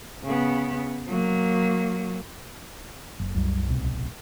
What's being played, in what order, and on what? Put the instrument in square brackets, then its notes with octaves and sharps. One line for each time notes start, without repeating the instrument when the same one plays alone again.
[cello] C#3 B3
F#3 A#3
[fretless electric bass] F#1
[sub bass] C2 [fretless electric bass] F#2 G3
[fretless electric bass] D1 B1 C3